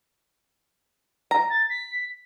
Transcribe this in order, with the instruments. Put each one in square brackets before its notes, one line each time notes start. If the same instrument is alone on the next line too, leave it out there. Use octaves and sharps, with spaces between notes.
[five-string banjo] A#5
[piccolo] A6
B6